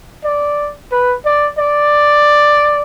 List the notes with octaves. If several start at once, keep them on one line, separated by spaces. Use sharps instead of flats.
D5
B4
D5
D5